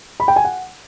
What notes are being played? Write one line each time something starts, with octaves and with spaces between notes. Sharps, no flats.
B5
G5
G#5
F#5